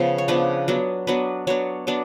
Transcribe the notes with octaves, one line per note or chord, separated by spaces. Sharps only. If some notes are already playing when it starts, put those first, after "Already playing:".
Already playing: C#3 F3 B3
C#5
C#3 F3 B3 D4 B4
F#3 B3 D4
F#3 B3 D4 B4
F#3 B3 D4 C#5
F#3 B3 D4